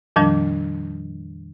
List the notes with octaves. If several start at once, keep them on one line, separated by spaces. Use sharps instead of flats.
F2 A#2 D#3 F3 G3 D4